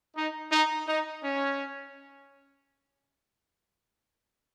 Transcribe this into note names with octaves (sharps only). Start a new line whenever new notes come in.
D#4
D#4
D#4
C#4